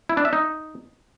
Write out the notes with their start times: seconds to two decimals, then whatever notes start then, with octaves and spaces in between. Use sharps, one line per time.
0.09 E4
0.17 D4
0.25 E5
0.33 D#4